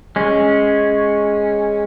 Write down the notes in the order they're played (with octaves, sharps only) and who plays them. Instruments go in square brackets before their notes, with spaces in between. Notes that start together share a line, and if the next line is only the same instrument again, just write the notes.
[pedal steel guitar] G#3 C#4